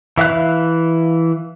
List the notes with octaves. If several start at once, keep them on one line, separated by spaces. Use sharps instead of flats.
E3 E5 F5 F#6